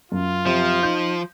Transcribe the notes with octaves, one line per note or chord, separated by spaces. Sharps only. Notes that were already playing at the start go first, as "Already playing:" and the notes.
F#2 F4
C3 F3
D#4 G6